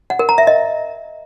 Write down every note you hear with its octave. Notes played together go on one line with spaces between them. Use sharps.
F#5
A#4
A#5
E5
D#5